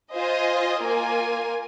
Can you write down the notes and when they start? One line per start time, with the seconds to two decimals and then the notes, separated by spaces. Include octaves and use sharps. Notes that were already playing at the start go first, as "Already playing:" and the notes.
0.14 F4 C5 D#5 G#5
0.81 A#3 F4 A#4 G#5